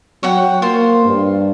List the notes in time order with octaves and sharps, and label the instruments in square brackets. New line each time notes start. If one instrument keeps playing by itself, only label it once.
[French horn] F#3 [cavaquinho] C#5 F#5 G5
[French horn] A#3 [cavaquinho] F4 C5
[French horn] G2